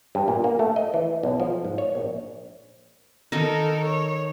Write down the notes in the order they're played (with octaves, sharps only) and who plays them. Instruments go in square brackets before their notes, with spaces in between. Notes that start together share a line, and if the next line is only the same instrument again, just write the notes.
[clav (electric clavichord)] G2
A#2
A#3
A3
D#5
E3
B1
F3
G#2
C#5
A#1
[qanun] D#3 D#4 [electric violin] A4 A#4
[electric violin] C#5